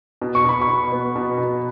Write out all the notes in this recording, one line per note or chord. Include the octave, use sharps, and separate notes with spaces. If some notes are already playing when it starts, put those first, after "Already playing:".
B2
C#6
B2 B5
C#6
B2
B3
B2
B2